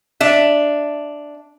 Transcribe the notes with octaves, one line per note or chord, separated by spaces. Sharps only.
D4 E5